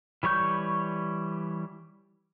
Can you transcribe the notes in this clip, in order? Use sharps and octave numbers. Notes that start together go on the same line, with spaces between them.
E3 G3 C#5 C#6 G6